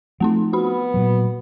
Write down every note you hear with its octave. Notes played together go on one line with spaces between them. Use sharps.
F3 A3 C4 D#4
B3 F#4 B5
A#2 F#3